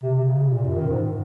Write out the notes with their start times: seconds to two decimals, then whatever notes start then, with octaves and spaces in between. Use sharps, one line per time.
0.03 C3
0.15 C3
0.28 C#3
0.39 C3
0.52 A#2
0.64 F#2
0.77 D#3
0.89 G#2